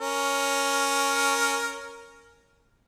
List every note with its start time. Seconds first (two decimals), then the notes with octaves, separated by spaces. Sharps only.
0.01 C#4 A#4